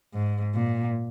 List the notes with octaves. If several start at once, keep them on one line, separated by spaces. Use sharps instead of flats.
G#2
A#2